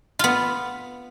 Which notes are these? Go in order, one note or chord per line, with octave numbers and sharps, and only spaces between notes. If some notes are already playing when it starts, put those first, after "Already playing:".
B3 F4